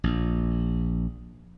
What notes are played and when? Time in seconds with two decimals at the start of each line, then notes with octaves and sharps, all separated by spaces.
0.04 A#1